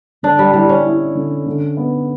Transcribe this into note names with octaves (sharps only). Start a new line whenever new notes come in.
D3 D4
G3
G3 E4
C#4
E4
D3
D3
B3